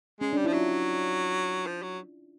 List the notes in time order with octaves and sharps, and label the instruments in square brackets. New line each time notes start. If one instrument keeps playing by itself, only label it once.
[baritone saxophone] G#3 [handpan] C#4
[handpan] D4
[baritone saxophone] G3
[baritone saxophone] F3 [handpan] E4
[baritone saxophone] F#3 [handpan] F4
[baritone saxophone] F3
F#3